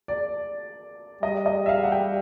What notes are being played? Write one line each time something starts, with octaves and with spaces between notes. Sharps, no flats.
D5
G3 D#5
D#5
E5
F5
F#5
G5